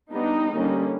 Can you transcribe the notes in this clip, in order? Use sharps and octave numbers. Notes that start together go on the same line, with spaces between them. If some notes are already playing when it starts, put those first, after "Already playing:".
G3 B3 D4 D#4
D3 G3 A#3 C#4